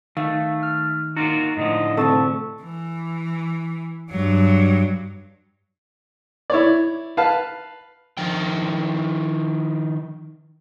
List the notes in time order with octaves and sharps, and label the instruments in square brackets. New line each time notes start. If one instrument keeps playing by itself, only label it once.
[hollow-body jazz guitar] D#3 [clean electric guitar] A3 [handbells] F5
[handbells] F6
[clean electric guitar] A#3 F4 F#4 [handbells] D#4
[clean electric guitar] A2 D3 F3 [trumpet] D#5
[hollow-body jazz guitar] D2 G#2 C3 [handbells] A4 C#6 [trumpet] A5
[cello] E3
G2 F#3
[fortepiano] E4 C#5 D5
B4 F5 A5
[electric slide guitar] D#3 F3 G5